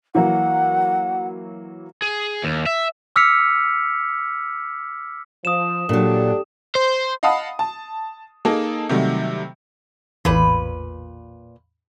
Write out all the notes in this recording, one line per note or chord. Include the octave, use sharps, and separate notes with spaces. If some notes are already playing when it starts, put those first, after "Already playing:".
E3 F#3 A#3 F#5
G#4
D#2
E5
D6 E6 F6 B6 C#7 F7
F3 D#6 E7
A#2 F#3 D4 G4 A4
C5
D#5 F5 F#5 A5 B5 D#6
A5
A#3 D#4 G#4 A4
C3 D#3 F#3 G3 A3
A1 E2 A#2 B4